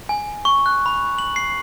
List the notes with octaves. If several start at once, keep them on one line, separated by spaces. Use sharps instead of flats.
G#5
C#6
F#6
B5
F#7
C7